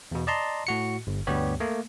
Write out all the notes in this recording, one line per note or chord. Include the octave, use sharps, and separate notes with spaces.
E2 B2
D5 D#5 A5 A#5 C6
A2 F#4 C#7
G1
D2 G2 G3 B3 G4 C#5
A3 A#3